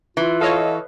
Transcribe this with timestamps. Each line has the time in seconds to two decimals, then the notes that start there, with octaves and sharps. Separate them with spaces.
0.17 E3 F4
0.41 A4 C#5 D#5 F5